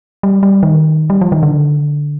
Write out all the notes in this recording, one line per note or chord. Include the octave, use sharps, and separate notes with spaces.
G3
G3
D#3
G3
F3
D#3
D3